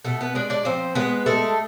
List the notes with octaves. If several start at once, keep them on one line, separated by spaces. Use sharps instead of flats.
B2 A3 A4
B3 B4
G#3 D4 D5
D4 D5
F3 C4 C5
G#3 B3 B4
G#3 A3 A4